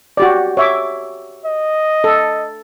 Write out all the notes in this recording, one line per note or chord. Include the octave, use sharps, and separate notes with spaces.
F#4 G4 D5
C#5 E5 D6
D#5
A4